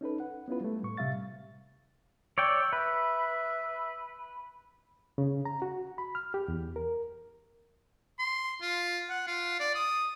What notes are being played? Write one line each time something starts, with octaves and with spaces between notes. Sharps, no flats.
C#4 D#4 A4 B4
F#5
B3 C#4 E4 F4 B4
G3 A3
A2 C#6
C3 G3 E5 F5 A6
C#5 D5 G5 E6
B4 E5
C#3
A#5
F#4
B5
F6
G4
E2
A#4
C6
F4
F#5
F4
D5
D#6